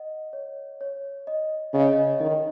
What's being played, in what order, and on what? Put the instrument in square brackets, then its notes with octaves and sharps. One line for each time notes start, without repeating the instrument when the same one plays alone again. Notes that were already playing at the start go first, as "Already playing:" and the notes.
Already playing: [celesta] D#5 F#5
C#5
C#5
D#5
[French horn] C#3 [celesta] D#5
[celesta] C#5
D#5
[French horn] D#3 [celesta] D#5